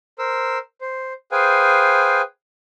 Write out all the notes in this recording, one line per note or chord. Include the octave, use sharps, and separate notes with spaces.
A#4 C5 E6
C5
G#4 B4 C5 F5 G5 G#5